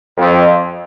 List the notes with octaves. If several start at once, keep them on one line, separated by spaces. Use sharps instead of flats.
F2